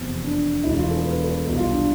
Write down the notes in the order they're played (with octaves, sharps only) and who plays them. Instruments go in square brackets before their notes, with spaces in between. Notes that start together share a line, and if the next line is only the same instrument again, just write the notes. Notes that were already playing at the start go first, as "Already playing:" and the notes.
Already playing: [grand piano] F1 E2 C3 C4
D4
E1 E2 B2 A3 E4
F4
A4
B4
A4
C2 B2 A3
F4
D4